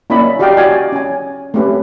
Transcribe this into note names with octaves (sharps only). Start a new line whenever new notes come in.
A#3 C#4 E4 D5 D#5 B5
F#4 G4 D5 D#5 F5 G5
E4 F#4 D5 G#5
C#4 G#5
A3 C4 C#4 G4 B4